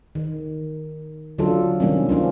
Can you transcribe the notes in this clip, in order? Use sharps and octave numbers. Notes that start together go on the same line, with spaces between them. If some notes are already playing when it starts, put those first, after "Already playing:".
D#3
D3 F#3 C#4 D4 F4 A4
C3 D#3 G3 A#3 C#4
F3 C#4 D4 F4